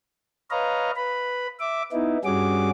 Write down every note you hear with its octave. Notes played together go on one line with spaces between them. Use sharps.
B4 C#5 D#5 F5 A#5
B4 B5
E5 D6
B3 D#4 E4
G2 G3 C#4 F#4 G#4 D6